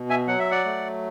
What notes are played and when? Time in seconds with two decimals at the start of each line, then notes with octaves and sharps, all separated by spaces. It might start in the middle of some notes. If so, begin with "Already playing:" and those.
Already playing: B2
0.09 E5 G#5
0.28 F#3 F#5
0.39 E5
0.51 D5 F#5
0.65 A3